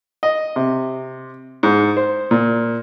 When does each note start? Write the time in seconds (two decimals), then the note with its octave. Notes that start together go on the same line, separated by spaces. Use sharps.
0.23 D#5
0.56 C3
1.63 G#2
1.97 C5
2.31 A#2